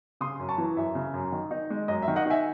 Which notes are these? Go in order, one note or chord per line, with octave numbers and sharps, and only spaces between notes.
C#3 C6 D#6
F#2
A5 C#6
E3
F#2 E5
C#3
F#2
D#3
D#4
G#3
F#2 D#5
E5
D#3
D#5 F#5
D#4 E5 G#5